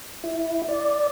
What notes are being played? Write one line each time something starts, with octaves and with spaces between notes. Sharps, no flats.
E4
D5